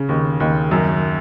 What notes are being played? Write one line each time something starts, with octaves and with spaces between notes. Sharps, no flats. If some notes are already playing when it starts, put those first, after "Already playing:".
Already playing: C#3
D#2
D#2
F#2